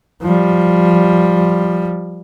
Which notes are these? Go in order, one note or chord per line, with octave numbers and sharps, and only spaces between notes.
F3 G3